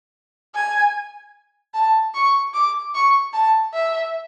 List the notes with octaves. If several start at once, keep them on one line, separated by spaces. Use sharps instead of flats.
G#5
A5
C#6
D6
C#6
A5
E5